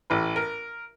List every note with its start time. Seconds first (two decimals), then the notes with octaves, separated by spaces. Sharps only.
0.10 A1 E3 B4
0.36 A#4